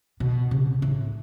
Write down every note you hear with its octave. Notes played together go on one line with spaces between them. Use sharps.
B2
C#3
A2